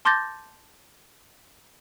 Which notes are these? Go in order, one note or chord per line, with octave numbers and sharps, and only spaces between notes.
A5 C6 D6 G6 A6 A#6